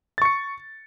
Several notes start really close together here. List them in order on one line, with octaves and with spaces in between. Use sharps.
A6 C#6 C#7